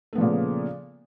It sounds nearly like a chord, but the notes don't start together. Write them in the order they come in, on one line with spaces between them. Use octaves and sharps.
A3 B3 F3 A#2 C#3